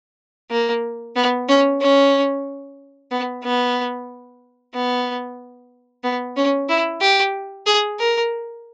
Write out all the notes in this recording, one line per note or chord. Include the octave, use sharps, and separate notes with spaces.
A#3
B3
C#4
C#4
B3
B3
B3
B3
C#4
E4
G4
G#4
A#4